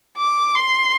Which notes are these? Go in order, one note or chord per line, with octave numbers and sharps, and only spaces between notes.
D6
C6